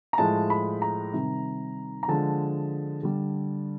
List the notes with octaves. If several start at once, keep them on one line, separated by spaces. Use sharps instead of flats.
A#5
A2 F3 G#3 A5
B5
A#5
C3 D#3 G3
A#5
D3 F3 G#3 A5
D3 G3